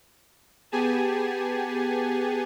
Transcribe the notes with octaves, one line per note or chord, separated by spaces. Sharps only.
B3 G4 G#4 G#5 A5